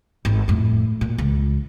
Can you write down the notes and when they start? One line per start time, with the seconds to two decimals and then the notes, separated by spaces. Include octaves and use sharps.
0.25 G#1
0.48 F2 A2
1.01 A#2
1.18 C#2